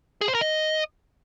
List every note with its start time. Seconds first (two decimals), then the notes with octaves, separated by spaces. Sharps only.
0.21 G#4
0.28 C5
0.35 A#4
0.41 D#5